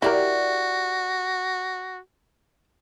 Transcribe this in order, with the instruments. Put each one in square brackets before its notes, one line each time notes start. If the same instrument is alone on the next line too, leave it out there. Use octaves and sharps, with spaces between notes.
[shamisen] E4 A#4 [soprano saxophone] F#4 [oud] G4 D5